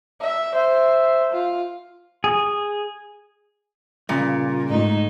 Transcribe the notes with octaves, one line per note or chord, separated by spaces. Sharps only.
E5
C5 E5
F4
G#4
G2 A#2 C#3
G#2 A3 D#4